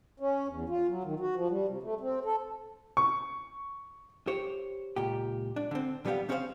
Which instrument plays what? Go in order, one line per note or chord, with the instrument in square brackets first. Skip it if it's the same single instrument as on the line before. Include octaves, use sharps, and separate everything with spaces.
[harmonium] C#4
E2
F4
F#3
D#3
F#4
F3
G3
C3
A3
C4
A4
[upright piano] C#6
[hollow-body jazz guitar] G4 C5 C#5
C#2 A#2 G4
D4
D3 C4
D3 G3 B3 C4 G4 F5
C4 C#4 G#4 A4 C5 F5